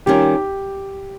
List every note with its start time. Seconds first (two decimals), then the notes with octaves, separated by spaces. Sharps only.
0.06 D#3 G3 C#4 F4 G4 A#4